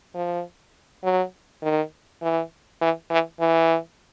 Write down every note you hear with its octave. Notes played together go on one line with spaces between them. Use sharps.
F3
F#3
D#3
E3
E3
E3
E3